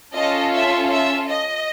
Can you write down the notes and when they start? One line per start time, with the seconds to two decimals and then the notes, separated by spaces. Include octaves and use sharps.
0.14 C#4 F4 A4 D#5
0.53 E5
0.90 E5
1.29 D#5